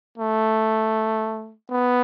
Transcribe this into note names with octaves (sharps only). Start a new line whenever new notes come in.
A3
B3